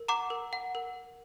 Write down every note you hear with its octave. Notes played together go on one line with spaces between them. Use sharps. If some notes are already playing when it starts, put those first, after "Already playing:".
Already playing: A#4
F#5 A#5 D6
A#4
F#5
A#4